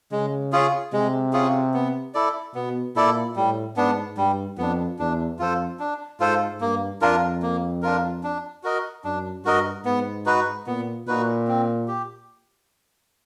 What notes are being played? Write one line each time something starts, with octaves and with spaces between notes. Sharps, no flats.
C#3 G#3
C#4 F4 G#4
C3 G#3
C#4 F4 G#4
B3
E4 A4 D5
B2 B3
A#2 E4 A4 D5
A2 G3
G#2 B3 D4
G2 G3
F2 B3 D4
E2 D4
F2 F4 A4 C5
D4
G#2 F4 A4 C5
G2 A#3
F2 D4 F4 A#4
A#3
D4 F4 A#4
D4
F#4 A#4 D#5
F#2 D4
G2 F#4 A#4 D#5
G#2 B3
D#4 F#4 B4
A#2 B3
A#2 D#4 F#4 B4
C4
G4